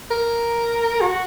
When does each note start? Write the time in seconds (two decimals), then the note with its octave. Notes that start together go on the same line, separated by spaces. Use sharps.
0.11 A#4
1.01 F#4